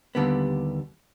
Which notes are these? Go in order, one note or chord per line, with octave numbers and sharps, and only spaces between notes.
D#2 D3 G3 B3